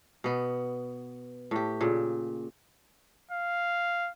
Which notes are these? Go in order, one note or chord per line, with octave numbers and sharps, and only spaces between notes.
B2 B3
A2 G4
A#2 C#3
F5